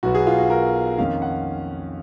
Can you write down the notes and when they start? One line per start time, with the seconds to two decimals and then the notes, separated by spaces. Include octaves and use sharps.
0.03 B1 B2 F#3 B3 F#4
0.15 G#4
0.27 F4
0.38 F#4
0.50 A#4
0.98 F2 D#3 A#3 C#4 F5
1.22 F#5